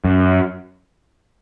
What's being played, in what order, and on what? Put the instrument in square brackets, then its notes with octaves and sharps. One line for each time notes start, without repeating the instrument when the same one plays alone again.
[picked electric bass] F#2